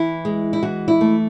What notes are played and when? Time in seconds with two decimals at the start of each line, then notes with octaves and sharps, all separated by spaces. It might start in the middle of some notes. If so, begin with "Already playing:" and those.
Already playing: E3 E4
0.25 G#3
0.53 E4
0.63 E3 F#4
0.88 E4
1.01 A3